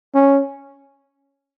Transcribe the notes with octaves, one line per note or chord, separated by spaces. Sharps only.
C#4